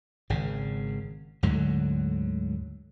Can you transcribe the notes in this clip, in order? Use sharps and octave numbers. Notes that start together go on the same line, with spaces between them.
G#1 C#3
D2 G#2 D3 F#3